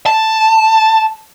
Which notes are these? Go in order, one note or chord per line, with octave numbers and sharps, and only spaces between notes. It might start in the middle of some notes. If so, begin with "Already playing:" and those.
A5